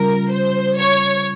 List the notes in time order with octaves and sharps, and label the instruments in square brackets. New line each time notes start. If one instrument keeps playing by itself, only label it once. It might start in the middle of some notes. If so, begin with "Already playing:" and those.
Already playing: [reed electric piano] C#3 G3 C#4 F4 [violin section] A#4
[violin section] C5
C#5